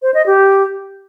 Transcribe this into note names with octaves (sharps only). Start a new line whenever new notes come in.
C5
D#5
G4